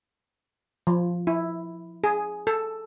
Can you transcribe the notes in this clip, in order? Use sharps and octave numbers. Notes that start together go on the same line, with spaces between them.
F3
E4
G#4
A4